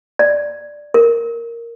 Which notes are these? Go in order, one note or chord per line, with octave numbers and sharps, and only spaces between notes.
D5
A#4